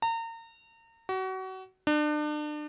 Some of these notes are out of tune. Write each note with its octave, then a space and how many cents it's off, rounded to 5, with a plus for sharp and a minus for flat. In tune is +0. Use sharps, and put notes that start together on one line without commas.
A#5 -35
F#4 +30
D4 +35